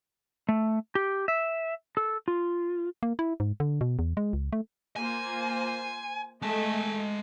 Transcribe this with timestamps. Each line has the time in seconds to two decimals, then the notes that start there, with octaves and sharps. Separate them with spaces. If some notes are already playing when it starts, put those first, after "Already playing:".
0.49 A3
0.95 G4
1.28 E5
1.97 A4
2.28 F4
3.03 A#3
3.19 E4
3.40 G#2
3.60 D3
3.81 B2
3.99 E2
4.17 G#3
4.33 C#2
4.53 A3
4.96 A#3 F4 C5 G#5
6.42 G#3 A3 D#5 G#5 A5